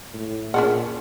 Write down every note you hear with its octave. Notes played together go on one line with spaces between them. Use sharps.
A2
A#2 C#4 D4 G#4 F#5